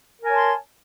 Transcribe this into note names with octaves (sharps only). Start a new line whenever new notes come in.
A#4 C#5 G#5 A5 C6